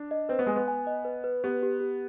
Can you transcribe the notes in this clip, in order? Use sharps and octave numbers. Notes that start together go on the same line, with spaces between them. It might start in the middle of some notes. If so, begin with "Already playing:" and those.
Already playing: D4
D#5
C4 B4
B3
G#3 G#5
B3
G#5
D#5
B4
B4
B3 G4
G4
G4